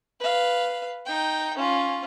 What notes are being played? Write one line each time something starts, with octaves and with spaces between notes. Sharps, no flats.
B4 F5
D#4 G5
C#4 F4